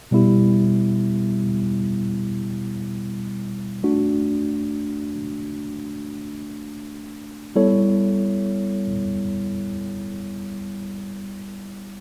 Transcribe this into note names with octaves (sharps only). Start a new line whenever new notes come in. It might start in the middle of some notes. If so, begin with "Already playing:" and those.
B2 G3 B3 E4 G4
A3 D4 F#4
G3 B3 E4 A4 C#5